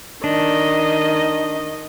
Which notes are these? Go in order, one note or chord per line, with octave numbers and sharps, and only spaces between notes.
D#3 D4 D#5